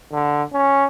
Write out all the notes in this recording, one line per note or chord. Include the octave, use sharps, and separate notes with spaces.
D3
C#4